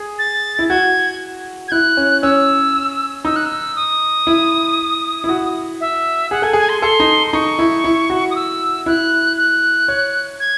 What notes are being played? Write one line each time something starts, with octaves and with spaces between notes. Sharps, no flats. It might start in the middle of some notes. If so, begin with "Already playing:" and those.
Already playing: G#4
A6
E4
F#4 G#6
G#6
E4 F#6
C#4
C#4 E6
D#4 E6
F#6
E6
D#6
E4
E4
F#4
E5
G#4 F#5
A4 G#5
G#4 G#5
C6
A4 C6
D#4
C6
D#4 C#6
E4
E4
F#4
D#6
E6
E4 F#6
F#6
C#5
G#6